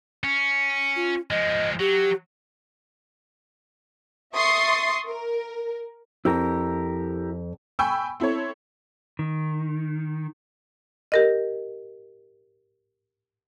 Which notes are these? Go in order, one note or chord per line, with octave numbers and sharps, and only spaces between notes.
C#4
F4
F3 G#3 D#5
F#3 G4
E5 C6 C#6 D#6 A6 C7
A#4
F2 E4 G4 A#4
G5 G#5 B5 C#6 E6
C4 E4 A4 C#5
D#3
G4 A#4 D#5